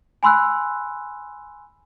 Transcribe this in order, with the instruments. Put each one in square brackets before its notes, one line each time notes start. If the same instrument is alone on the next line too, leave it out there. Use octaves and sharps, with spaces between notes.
[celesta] G#5 B5 C6 E6 F#6